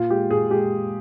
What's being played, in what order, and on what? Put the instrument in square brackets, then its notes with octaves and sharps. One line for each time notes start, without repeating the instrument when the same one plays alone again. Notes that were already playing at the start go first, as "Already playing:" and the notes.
Already playing: [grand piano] A#2 F4
G#3 G4
A#2 G#4
G#3 G4